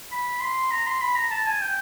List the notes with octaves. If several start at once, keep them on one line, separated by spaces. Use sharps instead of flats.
B5
C6
A#5
C6
B5
A#5
A5
G#5
G5